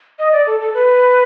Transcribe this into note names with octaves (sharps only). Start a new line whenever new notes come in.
D#5
D5
A4
A4
B4